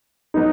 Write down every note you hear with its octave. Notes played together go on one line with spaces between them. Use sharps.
F#3 B3 D#4